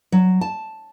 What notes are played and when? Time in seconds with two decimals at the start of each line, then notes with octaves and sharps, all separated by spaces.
0.12 F#3
0.41 A5